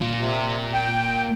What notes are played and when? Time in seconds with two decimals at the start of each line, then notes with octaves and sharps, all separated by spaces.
0.01 A#2
0.19 C3
0.73 G5